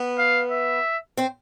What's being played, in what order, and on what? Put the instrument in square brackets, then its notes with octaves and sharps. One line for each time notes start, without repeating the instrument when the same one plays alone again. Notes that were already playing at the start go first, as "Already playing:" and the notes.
Already playing: [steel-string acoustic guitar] B3 B4
[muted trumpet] F5
E5
[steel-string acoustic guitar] C4 C5